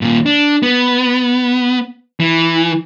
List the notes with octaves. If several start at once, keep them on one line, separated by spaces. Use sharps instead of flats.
D#2 A#2
D4
B3
E3